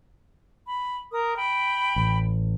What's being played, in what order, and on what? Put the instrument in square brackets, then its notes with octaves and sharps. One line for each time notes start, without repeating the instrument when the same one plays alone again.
[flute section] B5
A#4 D#6
G5 B5
[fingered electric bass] A1